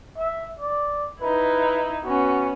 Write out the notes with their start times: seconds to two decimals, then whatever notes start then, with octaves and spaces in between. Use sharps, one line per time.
0.17 E5
0.59 D5
1.20 D#4 E4 B4
2.04 B3 C#4 F#4